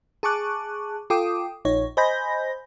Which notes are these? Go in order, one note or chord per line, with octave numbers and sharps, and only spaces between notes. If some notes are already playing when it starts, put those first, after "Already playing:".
G#4 A5 C#6 D6 F#6
F4 A4 G5 D6 D#6
A#1 D#4 C#5
C5 D#5 G#5 B5 G6 A#6